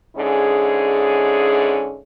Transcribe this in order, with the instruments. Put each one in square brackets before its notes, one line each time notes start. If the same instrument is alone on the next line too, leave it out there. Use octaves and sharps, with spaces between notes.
[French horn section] G#2 D3 C#4 E4 G#4